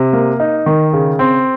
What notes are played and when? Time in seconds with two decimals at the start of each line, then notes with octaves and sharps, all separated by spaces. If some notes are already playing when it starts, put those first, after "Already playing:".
Already playing: C3
0.13 A#3
0.40 D#4
0.66 D#3
0.93 C#3
1.19 C4